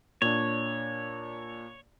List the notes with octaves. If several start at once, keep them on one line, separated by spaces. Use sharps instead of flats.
A#2 D4 C#5